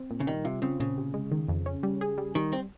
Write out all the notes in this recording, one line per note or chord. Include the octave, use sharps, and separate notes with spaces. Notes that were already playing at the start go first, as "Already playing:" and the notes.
Already playing: C4
A#2
C#3
D#3 G3
C3 F4
C#3 C4
A#2 C#3
C3
G#3
D#3
F2
C#4
G3
G#4
G3
D#3 G3
C4